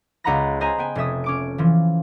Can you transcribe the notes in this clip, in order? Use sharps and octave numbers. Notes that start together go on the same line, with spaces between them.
C#2 D#5 F#5 A#5 B5 A#6
C5 D#5 G#5 A#5 B5
B3 G5 G#5
F1 C#4 E5 D#6
C#4 D6 D7
E3 F3